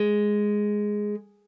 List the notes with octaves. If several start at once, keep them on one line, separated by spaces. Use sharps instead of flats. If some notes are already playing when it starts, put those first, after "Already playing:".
Already playing: G#3